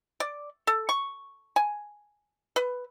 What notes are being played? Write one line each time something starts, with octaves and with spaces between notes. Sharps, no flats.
D5
A4
C#6
G#5
B4